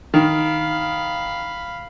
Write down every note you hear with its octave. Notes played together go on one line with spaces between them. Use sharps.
D#3 F5 B5